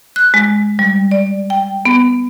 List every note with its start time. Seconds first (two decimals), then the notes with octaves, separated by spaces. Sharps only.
0.16 F#6
0.34 G#3
0.79 G3
1.11 D5
1.50 G5
1.85 B3